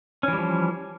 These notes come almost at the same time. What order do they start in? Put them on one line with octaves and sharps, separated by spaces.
C#4 E3 G3 F3